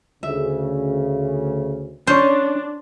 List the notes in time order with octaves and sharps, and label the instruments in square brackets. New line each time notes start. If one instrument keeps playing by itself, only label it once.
[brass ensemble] D2 C#3 [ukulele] E5
[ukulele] C#4 C#5 [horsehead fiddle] D4 [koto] C5